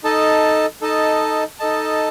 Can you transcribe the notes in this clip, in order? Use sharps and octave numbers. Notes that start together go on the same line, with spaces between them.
D#4 A4 D#5 A5
D#4 A4 D#5 A5
D#4 A4 D#5 A5